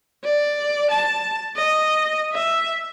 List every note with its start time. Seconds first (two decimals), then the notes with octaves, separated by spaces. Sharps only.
0.24 D5
0.91 A5
1.56 D#5
2.33 E5